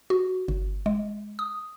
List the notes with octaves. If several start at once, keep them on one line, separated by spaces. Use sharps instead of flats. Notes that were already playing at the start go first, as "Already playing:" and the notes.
F#4
G1
G#3
D#6